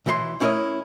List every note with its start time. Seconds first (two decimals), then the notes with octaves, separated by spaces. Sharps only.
0.06 B1 E3 E4 C5 C6
0.40 A3 C#4 E4 A#4 C#5 D#5